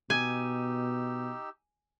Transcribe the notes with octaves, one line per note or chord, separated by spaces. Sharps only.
B2 D#4 G4 G#5 E6